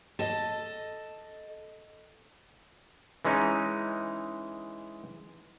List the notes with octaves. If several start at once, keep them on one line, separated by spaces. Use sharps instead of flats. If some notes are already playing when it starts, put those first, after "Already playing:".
A4 D#5
E3 G#3 C#4 D#4